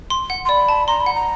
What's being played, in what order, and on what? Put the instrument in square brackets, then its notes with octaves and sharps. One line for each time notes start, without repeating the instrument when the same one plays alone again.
[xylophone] C6
F#5
[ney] C6
[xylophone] D5 [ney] B5
[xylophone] A5
[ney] A#5 [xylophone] C6
[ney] B5
[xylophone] F#5
[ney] A#5